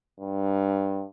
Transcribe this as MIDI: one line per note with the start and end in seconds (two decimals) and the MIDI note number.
0.20 1.04 43